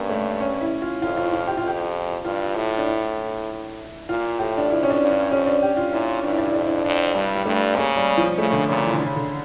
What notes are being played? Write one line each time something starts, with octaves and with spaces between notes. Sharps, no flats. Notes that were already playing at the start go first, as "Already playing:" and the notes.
Already playing: G2 A#3 C#4
A3
C#4
E4
F4
F2 F4
F4
F4
G4
F4
F2 G4
G2 F4
A2 E4
D4
E4
A#2 F4
A2 G4
D4
F2 E4
C#4
D4
G2
D4
F2 C#4
D4
G4
F4
A#2 E4
G2 D4
E4
D4
E4
F2 D4
E4
D4
E4
F2 D4
G2 G3
G3
G2 A3
C#3 A#3
G3
F3
C#3 A3
D3
A#2 C#3
E3
D3
C#3
D3